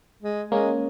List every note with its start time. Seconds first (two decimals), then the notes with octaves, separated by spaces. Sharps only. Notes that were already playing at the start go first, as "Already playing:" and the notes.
0.23 G#3
0.52 G#3 A#3 C#4